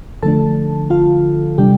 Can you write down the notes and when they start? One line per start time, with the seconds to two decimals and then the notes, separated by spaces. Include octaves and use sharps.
0.23 D3 F3 A3 D4 A4 A5
0.90 F4 F5
1.58 C3 G3 D4 G4 G5